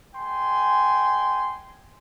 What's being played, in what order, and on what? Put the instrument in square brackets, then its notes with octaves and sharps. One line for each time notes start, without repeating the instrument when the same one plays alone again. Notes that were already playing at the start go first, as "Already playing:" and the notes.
[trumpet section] G#3 G5 G#5 C6